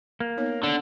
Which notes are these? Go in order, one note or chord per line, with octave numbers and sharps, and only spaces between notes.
A#3
B3 D#4 C#5
D3